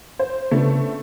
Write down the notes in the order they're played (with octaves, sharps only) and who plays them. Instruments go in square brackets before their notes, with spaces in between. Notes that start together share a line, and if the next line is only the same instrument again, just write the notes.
[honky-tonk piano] C5
[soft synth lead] C#3 [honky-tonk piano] A3 B3 D4